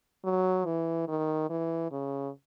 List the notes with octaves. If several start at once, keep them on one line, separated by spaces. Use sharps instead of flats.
F#3
E3
D#3
E3
C#3